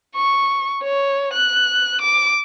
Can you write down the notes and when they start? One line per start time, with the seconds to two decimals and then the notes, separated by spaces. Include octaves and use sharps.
0.16 C#6
0.83 C#5
1.34 F#6
2.02 D6